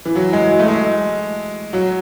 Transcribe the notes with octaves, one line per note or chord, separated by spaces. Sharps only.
E3
F#3
G#3
F#3
A3
G#3
F#3